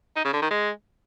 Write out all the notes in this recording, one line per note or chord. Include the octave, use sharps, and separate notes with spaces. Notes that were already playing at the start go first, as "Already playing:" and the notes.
D#4
C#3
D3
D#3
G#3